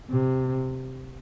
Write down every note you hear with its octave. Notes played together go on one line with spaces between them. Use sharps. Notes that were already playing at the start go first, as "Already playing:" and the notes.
C3